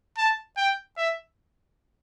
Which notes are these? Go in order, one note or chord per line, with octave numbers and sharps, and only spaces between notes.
A5
G5
E5